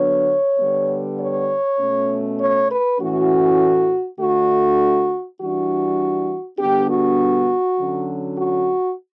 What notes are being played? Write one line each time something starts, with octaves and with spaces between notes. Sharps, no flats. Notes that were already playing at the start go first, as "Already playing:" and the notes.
Already playing: D3 F#3 B3 D4 C#5
D3 G3 B3
C#5
B2 A3 C#4
C#5
B4
A2 E3 A3 C#4 F#4
D3 A3 D4 F#4
E3 G3 D4 F#4
D3 G3 B3 D4 G4
F#4
D3 F#3 C#4
F#4